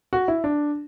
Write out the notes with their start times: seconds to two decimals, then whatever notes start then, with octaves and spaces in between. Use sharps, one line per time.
0.13 F#4
0.28 E4
0.44 D4